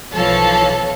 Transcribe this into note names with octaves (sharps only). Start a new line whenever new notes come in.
B1 E3 F3 A4 C#5 F5